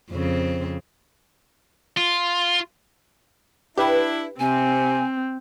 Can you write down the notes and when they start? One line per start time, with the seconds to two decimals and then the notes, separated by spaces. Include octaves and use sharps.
0.12 F2 C#3 C4
1.97 F4
3.78 D4 E4 G4 B4
4.40 C3 C4 G#5